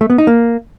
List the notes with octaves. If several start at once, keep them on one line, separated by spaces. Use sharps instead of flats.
A3
B3
D#4
A#3